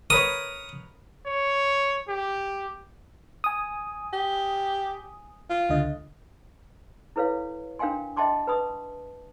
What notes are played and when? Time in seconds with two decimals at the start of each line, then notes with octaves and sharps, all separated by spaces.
0.10 A#4 B4 C#5 D#6
1.26 C#5
2.08 G4
3.44 G#5 D#6
4.13 G4
5.50 F4
5.69 C#2 D3 D#5
7.16 E4 A4 B4 C#5 F5
7.79 D4 A#4 F5 G5 G#5 C6
8.17 D#5 E5 G5 A5 C6 D6
8.47 B4 A5 B5 D#6